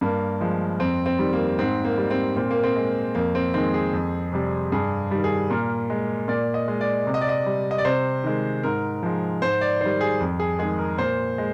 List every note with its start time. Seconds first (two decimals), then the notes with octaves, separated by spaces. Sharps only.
0.01 G2 A#3
0.41 F3 G#3
0.80 F2 C4
1.06 C4
1.19 D#3 G3
1.33 A#3
1.59 G#2 C4
1.85 A#3
1.98 G3
2.11 C4
2.36 A#2 C4
2.51 A#3
2.64 C4
2.76 G#3
3.15 F2 A#3
3.35 C4
3.54 D#3 G#3 C4
3.74 G#4
3.93 F2
4.33 C3 G3
4.72 G2 G#4
5.11 D#3 G3
5.24 G#4
5.50 A#2 A#4
5.90 G#3
6.28 A#2 D5
6.54 D#5
6.68 G#3
6.81 D5
7.07 C3
7.14 D#5
7.21 D5
7.29 D#5
7.46 G3
7.71 D#5
7.78 D5
7.85 C3 C5
8.24 D#3 G#3
8.63 G#2 A#4
9.03 F3 G#3
9.42 G#2 C5
9.61 D5
9.81 D#3 G3 C5
10.01 G#4
10.20 F2
10.40 G#4
10.59 D#3 G#3 G#4
10.79 A#4
10.98 A#2 C5
11.38 G#3